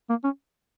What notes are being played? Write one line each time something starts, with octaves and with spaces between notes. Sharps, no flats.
A#3
C#4